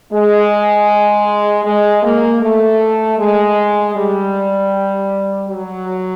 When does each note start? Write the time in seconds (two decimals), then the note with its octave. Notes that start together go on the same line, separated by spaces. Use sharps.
0.12 G#3
1.65 G#3
2.03 A#3
2.42 A3
3.18 G#3
3.95 G3
5.49 F#3